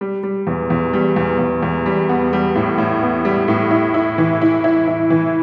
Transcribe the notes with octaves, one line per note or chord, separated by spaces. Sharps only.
G3
G3
E2
E2
G3
E2
E2
E2
G3
B3
G3
A2
A2
B3
G3
A2
E4
E4
E3
E4
E4
E4
E3